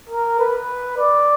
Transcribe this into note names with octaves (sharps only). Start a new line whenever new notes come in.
A#4
B4
D5